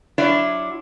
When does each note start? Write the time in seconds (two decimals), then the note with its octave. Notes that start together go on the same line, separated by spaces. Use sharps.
0.18 F#3 D4 E4 F4 D5